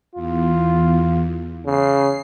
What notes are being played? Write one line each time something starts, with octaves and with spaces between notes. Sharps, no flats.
E2 F4
C#3 C7